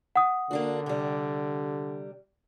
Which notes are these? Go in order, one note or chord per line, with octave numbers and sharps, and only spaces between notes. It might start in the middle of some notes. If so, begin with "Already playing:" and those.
F#5 D#6
D3 A#3 D4 F#4
C3 G3